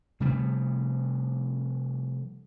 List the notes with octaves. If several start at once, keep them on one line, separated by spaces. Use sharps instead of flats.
C3 F3 G3 A3